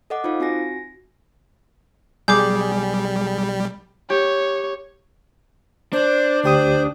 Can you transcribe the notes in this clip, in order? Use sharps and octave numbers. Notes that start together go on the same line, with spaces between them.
A4 D#5 F#5 D6
D#4 F4 C5 F5
C4 F#4 G#5 A#6
B1 G3 G#4 D6 G6
G4 C#5
D4 C5
D2 G4 C5 D#6